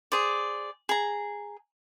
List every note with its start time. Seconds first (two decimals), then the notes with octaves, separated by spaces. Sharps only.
0.12 G#4 C5 D5
0.89 G#4 A#5